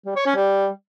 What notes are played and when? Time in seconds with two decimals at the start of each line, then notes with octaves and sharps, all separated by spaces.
0.06 G3
0.16 C#5
0.26 C#4
0.36 G3